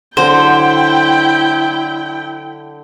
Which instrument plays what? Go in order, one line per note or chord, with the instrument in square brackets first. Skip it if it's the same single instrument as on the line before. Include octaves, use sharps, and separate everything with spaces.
[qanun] D3 F#3 [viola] E4 G5 [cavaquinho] C5